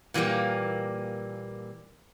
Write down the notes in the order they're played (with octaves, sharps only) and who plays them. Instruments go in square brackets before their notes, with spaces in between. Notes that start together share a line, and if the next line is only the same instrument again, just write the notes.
[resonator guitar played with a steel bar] A#2 E3 F#3 G3 A#3